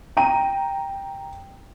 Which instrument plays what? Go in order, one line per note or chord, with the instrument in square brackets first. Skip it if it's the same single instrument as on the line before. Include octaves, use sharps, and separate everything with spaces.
[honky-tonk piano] G5 A#5 D#7